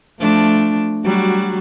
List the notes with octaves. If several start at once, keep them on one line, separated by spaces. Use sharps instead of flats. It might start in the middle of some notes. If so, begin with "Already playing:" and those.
F3 A3 D4
F#3 G3 F#4